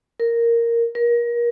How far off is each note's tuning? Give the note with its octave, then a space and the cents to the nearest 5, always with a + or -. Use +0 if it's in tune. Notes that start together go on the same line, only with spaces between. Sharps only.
A#4 -5
A#4 +30